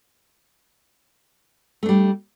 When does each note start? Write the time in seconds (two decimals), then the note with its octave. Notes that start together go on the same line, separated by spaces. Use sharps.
1.83 A3
1.86 D4
1.89 G3